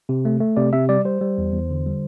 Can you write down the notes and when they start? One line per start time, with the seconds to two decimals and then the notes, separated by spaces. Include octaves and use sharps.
0.09 C3
0.25 A3
0.40 A3
0.57 C3 D5
0.73 C3 E5
0.89 G3 D5
1.05 G3 C5
1.21 G3
1.38 E2
1.53 E2
1.70 D3
1.86 G3